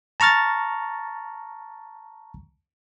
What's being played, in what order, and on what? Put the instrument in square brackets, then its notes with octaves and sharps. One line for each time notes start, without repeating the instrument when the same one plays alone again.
[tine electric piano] A5 A#5 C#6 F6 A6